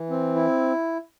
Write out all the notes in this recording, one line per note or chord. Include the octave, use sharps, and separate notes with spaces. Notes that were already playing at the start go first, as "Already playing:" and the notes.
Already playing: E3
C4
E4